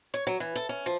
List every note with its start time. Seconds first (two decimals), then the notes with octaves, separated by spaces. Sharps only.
0.14 C#5
0.27 F#3
0.40 E3
0.55 A4
0.69 C#4
0.86 F3